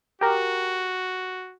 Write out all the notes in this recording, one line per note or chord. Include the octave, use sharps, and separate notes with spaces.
F#4 G4 A#4